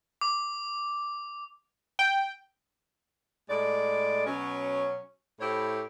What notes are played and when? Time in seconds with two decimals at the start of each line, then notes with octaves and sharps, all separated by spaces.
0.21 D6
1.99 G5
3.50 A2 G#3 D5
4.27 B2 F#3 C#4
5.40 A2 E4 G4 C5 C#5